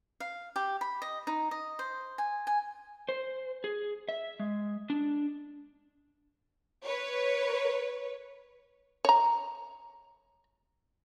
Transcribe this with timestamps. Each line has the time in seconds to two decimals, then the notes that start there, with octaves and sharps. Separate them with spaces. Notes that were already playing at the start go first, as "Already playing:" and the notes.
0.20 F5
0.56 G4
0.81 B5
1.02 D#5
1.27 D#4
1.51 D#5
1.79 C5
2.18 G#5
2.47 G#5
3.09 C5
3.64 G#4
4.09 E5
4.39 G#3
4.90 D4
6.83 B4 C#5
9.05 C#5 A#5